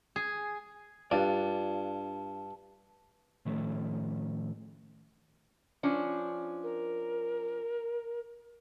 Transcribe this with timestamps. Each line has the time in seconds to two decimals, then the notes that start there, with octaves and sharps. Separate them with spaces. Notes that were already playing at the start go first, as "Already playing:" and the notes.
0.16 G#4
1.11 G2 D4 F4 D5 A5
3.46 A2 D#3 F3 A3 C#4
5.83 F3 C#4 D4
6.63 A#4